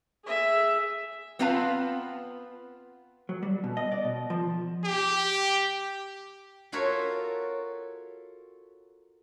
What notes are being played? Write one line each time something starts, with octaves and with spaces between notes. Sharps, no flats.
G#4 E5
B3 C4 F4 B4 F5 A5
F#3
G3
B2
D#5
D5
B2
F3
G4
F4 F#4 A4 A#4 C#5 E5